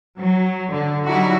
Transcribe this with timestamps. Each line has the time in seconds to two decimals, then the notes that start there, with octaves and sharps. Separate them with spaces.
0.18 F#3
0.71 D3
1.06 F#3 G3 D#4 E4 F#4